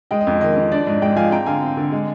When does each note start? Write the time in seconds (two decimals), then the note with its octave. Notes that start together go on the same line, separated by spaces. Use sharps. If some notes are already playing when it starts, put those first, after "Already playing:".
0.11 G#3 D#5 G5
0.21 D#5
0.27 F2
0.41 D#3 D#5
0.56 F2
0.72 D4 D5
0.86 G#2 D#5
1.02 G#3 D#5 G5
1.16 F3 F5 G#5
1.31 C4 G5 A#5
1.46 D3 F5 G#5
1.62 C4
1.77 D3
1.92 G#3